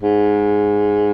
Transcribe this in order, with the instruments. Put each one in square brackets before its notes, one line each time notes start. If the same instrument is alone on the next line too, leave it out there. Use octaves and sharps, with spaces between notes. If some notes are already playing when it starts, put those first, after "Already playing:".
[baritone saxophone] G#2